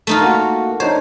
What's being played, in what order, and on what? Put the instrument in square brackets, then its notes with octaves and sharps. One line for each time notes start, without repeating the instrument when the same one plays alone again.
[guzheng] A3 D#4 F4
[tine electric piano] A#3 F#4
[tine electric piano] D4 D#4 C#5 [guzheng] C5